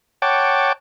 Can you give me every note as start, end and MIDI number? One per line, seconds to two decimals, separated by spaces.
0.22 0.72 73
0.22 0.72 78
0.22 0.72 79
0.22 0.72 81
0.22 0.72 86